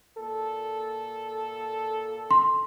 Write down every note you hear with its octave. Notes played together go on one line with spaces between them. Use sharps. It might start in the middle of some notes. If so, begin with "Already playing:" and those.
A#2 A4
C6